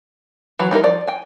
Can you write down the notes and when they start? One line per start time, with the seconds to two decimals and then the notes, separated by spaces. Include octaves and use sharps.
0.59 E3 F#3 B5
0.71 G3 D#4 E4 A#4
0.84 F3 D5
1.07 G5 G#5